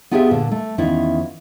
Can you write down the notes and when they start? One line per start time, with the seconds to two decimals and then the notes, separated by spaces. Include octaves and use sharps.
0.11 B3 F4 G4 G#4 C#5 E5
0.31 A#2 D3
0.51 A3
0.78 E2 D#3 C#4 E4 F4